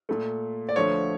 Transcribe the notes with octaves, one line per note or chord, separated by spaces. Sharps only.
A#2 A3
D5
D2 D3 F3 A3 C#5